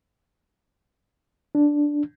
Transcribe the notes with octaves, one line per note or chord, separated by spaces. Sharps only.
D4